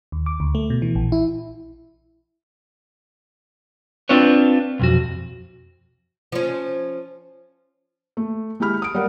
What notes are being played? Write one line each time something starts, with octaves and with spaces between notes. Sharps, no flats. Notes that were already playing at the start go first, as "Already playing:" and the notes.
D#2
D6
D2
A3
B2
E3
A#1
E4
C4 D4 F4 B4 C#5
B1 F2 F#4
F3 C#4
A3
G#3 E4 G4 B5 F6
D#6 D7
G3 A#4 F5 F#5